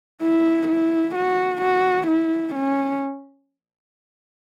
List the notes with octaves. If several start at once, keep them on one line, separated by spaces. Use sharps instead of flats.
E4
E4
F#4
F#4
E4
C#4